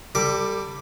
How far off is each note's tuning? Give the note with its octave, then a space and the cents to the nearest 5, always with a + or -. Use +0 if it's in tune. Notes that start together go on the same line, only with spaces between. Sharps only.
G3 +10 A4 +40 D6 +0